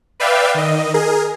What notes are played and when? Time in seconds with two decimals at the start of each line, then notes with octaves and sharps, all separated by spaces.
0.20 B4 D5 E5 F5 G5
0.54 D#3 D#5
0.94 G#4 A#4